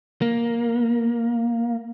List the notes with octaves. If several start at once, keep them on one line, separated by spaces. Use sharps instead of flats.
A#3